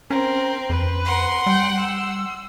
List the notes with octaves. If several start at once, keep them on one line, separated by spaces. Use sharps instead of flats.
C4 C#4 A#4
F2 B4
F#5 C6
G3 G5
E6